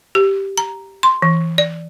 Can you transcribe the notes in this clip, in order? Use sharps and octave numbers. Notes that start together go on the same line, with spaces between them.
G4
A#5
C6
E3
D5